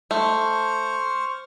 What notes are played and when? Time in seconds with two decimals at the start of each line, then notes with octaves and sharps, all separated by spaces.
0.11 A3 C5 C#6 F6